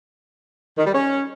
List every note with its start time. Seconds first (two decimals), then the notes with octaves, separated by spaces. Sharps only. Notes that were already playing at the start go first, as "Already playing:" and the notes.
0.78 D#3
0.86 G3
0.94 C#4